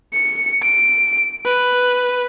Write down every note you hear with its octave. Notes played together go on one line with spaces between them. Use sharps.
C#7
D7
B4